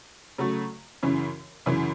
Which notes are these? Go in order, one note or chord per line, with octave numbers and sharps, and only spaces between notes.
C#3 F#3 A3
F#2 C#3 E3
F#2 C#3 E3